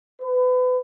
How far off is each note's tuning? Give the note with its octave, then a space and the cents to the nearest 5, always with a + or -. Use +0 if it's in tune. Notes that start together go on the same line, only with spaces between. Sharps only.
B4 +30